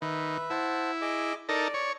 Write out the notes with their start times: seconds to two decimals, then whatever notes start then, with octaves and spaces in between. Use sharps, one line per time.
0.02 D#3 B4 E5 B5
0.50 E4 C5 F#5 A5
1.01 G#4 D#5 D6
1.49 D#4 A4 A#4 D5
1.74 C#5